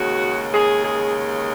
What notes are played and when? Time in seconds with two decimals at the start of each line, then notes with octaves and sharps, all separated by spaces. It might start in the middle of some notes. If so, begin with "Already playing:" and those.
Already playing: D#2 C#3 G#3 F#4
0.52 G#4
0.82 G#4